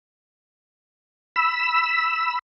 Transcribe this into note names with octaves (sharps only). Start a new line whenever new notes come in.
B5 E6